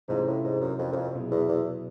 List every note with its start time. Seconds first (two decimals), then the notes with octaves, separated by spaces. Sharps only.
0.08 G#2 C3 E3 A3 C#4 F4
0.27 A2
0.44 G#2
0.61 F#2
0.79 F2
0.92 F#2
0.96 F2
1.13 B2 F#3 B3 E4 G#4
1.31 E2
1.49 E2